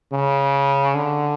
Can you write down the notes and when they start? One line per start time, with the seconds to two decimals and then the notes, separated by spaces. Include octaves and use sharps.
0.13 C#3
0.95 D3